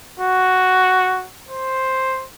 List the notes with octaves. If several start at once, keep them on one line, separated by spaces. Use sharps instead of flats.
F#4
C5